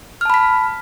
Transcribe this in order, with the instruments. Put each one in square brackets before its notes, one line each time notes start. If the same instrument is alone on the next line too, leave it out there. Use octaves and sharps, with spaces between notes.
[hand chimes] F6
A5
B5
B6